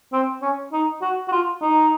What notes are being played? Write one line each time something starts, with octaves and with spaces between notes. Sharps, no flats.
C4
C#4
D#4
F#4
F#4
F4
D#4